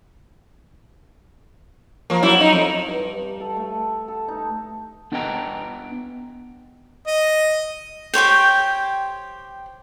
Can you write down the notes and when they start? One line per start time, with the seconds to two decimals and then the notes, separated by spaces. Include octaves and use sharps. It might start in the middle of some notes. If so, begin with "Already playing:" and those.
2.10 F3 A#3
2.22 F#3 E4
2.40 D#4
2.53 F2
2.88 G2
3.40 A4
3.57 A3
4.08 A4
4.28 D#4
5.12 B3 D4 B4 D#5 G5 A#5
7.07 D#5
8.14 G4 C5 C#5 G5